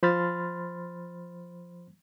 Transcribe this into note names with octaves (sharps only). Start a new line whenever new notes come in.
F3 C5 B5 C6 F6 A6